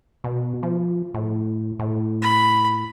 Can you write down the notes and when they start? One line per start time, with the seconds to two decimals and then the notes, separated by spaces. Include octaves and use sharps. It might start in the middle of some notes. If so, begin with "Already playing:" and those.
0.24 B2
0.63 F3
1.14 A2
1.79 A2
2.22 B5